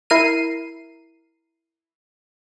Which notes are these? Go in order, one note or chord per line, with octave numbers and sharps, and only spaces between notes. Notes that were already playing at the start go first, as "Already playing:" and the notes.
E4 A#4 C7 D#7